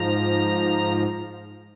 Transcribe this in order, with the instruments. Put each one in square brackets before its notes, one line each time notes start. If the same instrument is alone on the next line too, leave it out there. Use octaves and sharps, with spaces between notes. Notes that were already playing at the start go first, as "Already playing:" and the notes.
Already playing: [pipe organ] G#2 F3 A#5